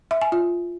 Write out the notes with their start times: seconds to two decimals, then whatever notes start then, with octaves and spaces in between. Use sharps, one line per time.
0.11 E5
0.22 G#5
0.32 F4